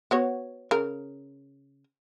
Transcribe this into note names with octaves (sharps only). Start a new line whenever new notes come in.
B3 F#4 C#5
C#3 A#4